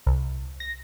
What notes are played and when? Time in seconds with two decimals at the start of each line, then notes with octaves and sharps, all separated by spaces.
0.06 C2
0.60 A#6